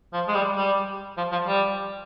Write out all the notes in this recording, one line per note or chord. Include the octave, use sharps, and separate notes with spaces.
F3
G#3
G3
G3
F3
F3
G3